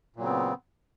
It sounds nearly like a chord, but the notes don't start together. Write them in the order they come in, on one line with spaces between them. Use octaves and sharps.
A#2 F#3 C#3 C4 B3